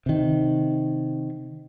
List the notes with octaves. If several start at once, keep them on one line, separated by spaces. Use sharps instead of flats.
C3 D#3